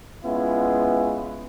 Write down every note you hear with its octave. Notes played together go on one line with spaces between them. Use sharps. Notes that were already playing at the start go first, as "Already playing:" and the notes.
G#3 B3 C#4 E4 F4